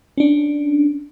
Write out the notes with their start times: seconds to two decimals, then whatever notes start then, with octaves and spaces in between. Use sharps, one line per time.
0.18 C#4 D4